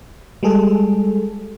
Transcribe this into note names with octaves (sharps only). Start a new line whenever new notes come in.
G3 G#3 G#4 A4